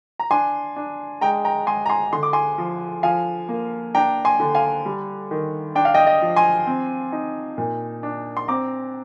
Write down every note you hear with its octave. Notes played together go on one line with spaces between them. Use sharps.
A#5
D4 G#5 C6
D4
G#3 G5 A#5
G5 A#5
G#3 G#5 C6
A#5
G#5 C6
D3 C6
D6
G#5 C6
F3
F3 F5 G#5
A#3
D4 G5 A#5
G#5 C6
D3
F5 G#5
G3
D#3
D4 G5
F5
D#5 G5
D#5
F3
G#5 C6
C4
D#4
A#2
D4
C6
C4 A#5 D6